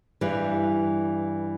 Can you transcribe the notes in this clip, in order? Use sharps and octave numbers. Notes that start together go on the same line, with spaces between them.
G2 E3 G3